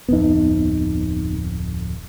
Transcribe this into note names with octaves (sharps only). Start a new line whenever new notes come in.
D1 F2 B3 D#4